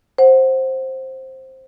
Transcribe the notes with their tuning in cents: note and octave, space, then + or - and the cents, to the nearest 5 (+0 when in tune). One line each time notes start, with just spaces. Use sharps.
C5 +10 F#5 +0